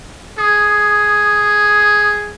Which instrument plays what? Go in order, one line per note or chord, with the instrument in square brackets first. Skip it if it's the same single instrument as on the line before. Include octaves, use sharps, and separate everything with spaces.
[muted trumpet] G#4 [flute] D#6